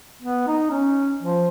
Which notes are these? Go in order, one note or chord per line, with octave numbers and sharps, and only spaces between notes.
B3
D#4
C#4
F3